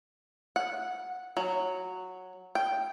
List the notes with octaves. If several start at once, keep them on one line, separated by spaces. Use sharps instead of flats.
F#5
F#3
G5